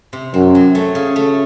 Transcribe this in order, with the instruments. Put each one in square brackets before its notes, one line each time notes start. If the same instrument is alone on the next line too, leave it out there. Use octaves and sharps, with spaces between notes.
[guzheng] C3
[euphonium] F#2 [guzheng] C4
[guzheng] F#3
A3
C#3
A3